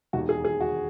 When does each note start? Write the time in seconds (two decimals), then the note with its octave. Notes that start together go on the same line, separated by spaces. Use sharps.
0.13 E1 D#2 D#3 F#4
0.29 G#4
0.45 G#4
0.61 F#4